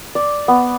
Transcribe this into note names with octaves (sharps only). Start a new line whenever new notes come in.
D5
B3